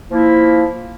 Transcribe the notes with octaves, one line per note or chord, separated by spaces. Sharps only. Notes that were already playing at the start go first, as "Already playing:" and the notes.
F3 A#3 E4